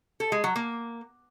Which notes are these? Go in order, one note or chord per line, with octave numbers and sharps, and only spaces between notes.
A4
G#3
F#3
A#3